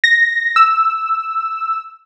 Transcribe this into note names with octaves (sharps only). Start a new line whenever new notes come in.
A#6
E6